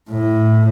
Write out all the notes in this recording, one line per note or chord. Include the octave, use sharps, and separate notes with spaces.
A2